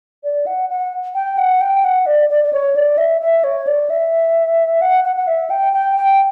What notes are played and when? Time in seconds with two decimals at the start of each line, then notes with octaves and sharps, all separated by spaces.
0.24 D5
0.46 F#5
0.69 F#5
1.15 G5
1.37 F#5
1.61 G5
1.84 F#5
2.06 D5
2.29 D5
2.44 D5
2.53 C#5
2.75 D5
2.98 E5
3.21 E5
3.44 C#5
3.67 D5
3.90 E5
4.81 F#5
5.04 F#5
5.16 F#5
5.27 E5
5.50 G5
5.73 G5
5.96 G5